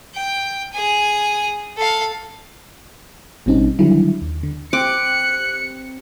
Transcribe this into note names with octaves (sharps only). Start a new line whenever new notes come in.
G5
G#4 G#5
A4 F5
A1 B2 G3 C4 C#4 D#4
D3 D#3 F#3 G3 E4
D#2
D3
C4 G4 D6 F#6 C#7